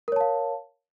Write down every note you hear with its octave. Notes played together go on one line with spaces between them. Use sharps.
A#4 C#5 F5 A5